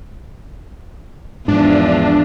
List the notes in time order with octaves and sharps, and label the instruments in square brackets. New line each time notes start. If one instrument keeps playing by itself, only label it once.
[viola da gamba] E2 F3 [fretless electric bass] G#2 [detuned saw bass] D4